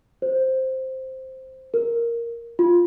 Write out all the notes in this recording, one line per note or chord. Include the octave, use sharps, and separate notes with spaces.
C5
A#4
F4